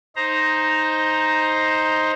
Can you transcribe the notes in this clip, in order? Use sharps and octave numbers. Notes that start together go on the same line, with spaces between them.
D#4 C5 A#5